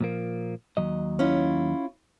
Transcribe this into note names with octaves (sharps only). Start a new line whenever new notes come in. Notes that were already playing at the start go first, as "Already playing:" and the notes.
A#2 F3 A#3
D#2 F#3 D#5
C#4 E4 F4